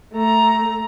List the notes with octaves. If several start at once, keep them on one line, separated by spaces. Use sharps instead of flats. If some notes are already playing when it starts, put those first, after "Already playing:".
A3 A#5